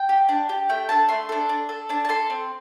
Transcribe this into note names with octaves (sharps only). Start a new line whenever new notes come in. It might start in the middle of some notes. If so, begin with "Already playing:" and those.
Already playing: G5
G4
D4
G4
A3 G5
D4 A4 A5
A3 C6
D4 A4
D4
A4
D4 A5
A5
A4 C6
C4